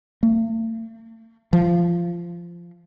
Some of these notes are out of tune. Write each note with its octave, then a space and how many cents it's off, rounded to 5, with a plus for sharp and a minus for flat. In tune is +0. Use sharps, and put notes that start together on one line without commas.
A3 +45
F3 -15